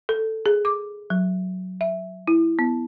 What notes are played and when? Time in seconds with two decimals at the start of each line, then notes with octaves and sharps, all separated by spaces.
0.09 A4
0.46 G#4
0.65 D6
1.10 F#3
1.81 E5
2.28 E4
2.59 B3